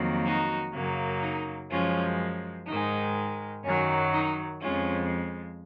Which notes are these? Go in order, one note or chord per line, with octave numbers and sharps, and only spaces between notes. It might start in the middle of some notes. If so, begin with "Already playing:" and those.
Already playing: F2 D#3 F#3 A#3
D#4 F#4
F#2 C#3 F#3 A#3
D#4
F#2 F3 G#3 C#4 F4
G#2 D#3 G#3 D#4
F#2 D#3 F#3 C#4
D#4
F2 F3 G#3 C#4 F4